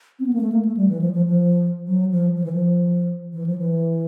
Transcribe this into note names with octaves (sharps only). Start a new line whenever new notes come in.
C4
B3
A#3
A3
A#3
A3
G3
E3
F3
F3
F3
F#3
F3
F3
E3
F3
E3
F3
E3